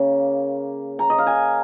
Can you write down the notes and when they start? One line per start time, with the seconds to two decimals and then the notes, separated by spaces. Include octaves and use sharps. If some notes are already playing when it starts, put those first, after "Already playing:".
Already playing: C#3 A#3
0.99 A#5
1.10 D#5
1.18 F5
1.27 G#5